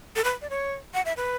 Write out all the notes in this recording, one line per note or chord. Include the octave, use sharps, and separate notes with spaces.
A4
B4
D5
C#5
F#5
E5
B4